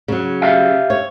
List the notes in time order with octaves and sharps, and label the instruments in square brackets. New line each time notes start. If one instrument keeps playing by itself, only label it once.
[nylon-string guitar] C#3 F#3
[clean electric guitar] G4 E5 F5
[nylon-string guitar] C#5